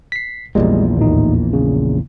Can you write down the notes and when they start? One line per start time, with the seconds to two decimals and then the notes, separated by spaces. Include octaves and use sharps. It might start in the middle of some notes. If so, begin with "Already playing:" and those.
0.12 B6 C7
0.55 A#1 E2 A#2 G3 G#3
0.97 D#2 A2 D#4
1.53 C#3